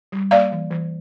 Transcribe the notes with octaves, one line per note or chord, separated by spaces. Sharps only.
G3
A#3 D5 F5
E3
E3